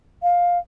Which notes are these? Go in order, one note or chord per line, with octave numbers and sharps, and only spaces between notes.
F5